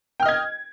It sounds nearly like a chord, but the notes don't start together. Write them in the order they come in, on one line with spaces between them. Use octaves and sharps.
G5 F6 D#5 G#6